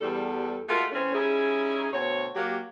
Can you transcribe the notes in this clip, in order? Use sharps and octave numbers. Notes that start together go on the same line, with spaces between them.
E2 G3 A4
G#3 A3 F4 F#4 G#4 A#4
E3 A3 C4 C#4
G3 C#4 D#4 E4 G#4
D2 B2 C4 C#5
F#3 A#3 G4